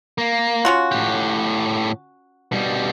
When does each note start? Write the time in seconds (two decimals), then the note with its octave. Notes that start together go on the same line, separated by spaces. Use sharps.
0.18 A#3
0.65 C#4 F4 F#4
0.92 A2 G4
2.52 B2 G3